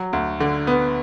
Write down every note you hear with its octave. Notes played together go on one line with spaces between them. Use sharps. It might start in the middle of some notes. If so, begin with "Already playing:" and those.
Already playing: F#3
D2
D3
B3